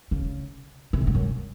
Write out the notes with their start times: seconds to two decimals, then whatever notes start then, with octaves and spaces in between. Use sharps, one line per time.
0.11 C#3
0.93 C3
1.00 A2
1.07 G#2
1.15 F#2